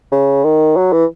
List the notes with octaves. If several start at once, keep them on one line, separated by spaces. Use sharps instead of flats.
C#3
D#3
F#3
E3